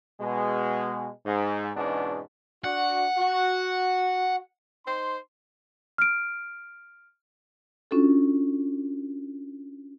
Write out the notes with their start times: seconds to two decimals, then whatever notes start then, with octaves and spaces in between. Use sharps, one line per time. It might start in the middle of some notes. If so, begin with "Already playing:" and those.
0.21 B2 G#3
1.25 G#2
1.76 E2 G#2 B2 B3 C#4 D4
2.64 D4 F#4 F#5
3.17 F#4
4.86 D#4 C5 C6
5.98 F6 D7
7.91 C#4 D4 F4 F#4 A4